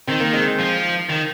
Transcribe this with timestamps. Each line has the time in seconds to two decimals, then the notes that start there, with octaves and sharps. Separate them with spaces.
0.07 D#3 C4
0.20 A#3
0.33 G#3 C4
0.59 F3
1.10 D#3